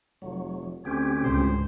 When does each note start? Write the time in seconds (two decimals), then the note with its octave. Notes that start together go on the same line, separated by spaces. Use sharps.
0.22 F1 F#3
0.85 D2 C4 C#4 G4 G#5
1.23 C#2 G#2 C5